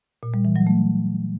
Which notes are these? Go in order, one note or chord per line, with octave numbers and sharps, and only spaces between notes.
A#2
G3
E3
F#3
A3